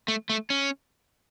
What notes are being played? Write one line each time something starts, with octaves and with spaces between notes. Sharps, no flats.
A3
A3
C#4